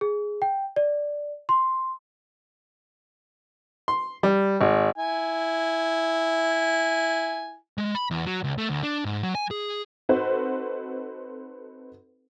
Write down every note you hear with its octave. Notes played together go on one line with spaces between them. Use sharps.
G#4
G5
D5
C6
C6
G3
G#1
E4 G#5
G#3
B5
E2
F#3
C#2
A3
D2
D4
G#2
F#3
G#5
G#4
C4 D#4 F#4 A4 B4 C5